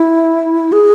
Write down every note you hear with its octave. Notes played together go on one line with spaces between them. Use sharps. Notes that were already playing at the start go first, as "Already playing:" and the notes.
Already playing: E4
G#4